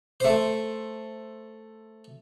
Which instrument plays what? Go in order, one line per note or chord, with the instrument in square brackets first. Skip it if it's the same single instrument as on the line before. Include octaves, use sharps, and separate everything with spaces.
[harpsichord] A3 C5